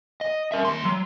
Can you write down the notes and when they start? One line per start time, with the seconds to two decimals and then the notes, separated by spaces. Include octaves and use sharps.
0.21 D#5
0.52 A#4 E5
0.65 D#2 C6
0.85 F#3